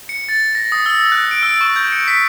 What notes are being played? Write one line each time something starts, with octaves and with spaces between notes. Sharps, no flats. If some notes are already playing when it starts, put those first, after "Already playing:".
C#7
A6
A#6
D#6
E6
F#6
D7
E6
C#6
G6
C#7
B6